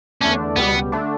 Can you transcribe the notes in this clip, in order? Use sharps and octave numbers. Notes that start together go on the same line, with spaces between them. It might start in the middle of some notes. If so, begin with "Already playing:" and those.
E2 D3 A3 C#4 D4
C#2 B2 G3 B3
D3 A3 D4